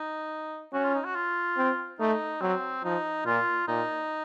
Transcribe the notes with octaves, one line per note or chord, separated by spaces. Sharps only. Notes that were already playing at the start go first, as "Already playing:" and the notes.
Already playing: D#4
C#4 F#4
F4
D#4
F#4
F4
C4
A3 D#4
F#3 C4
F3 D#4
A#2 F4
A#2 D#4